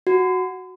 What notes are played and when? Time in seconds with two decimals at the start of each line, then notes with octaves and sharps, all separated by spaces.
0.07 F#4